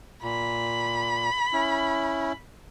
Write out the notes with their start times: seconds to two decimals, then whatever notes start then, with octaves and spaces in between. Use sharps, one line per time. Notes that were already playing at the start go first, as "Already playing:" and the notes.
0.23 A#2 B5
1.53 C#4 E4